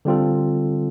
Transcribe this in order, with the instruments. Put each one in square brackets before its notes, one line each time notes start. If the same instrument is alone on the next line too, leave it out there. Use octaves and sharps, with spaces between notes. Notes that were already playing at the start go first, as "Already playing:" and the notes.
[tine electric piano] D3 G3 C4 F4 A4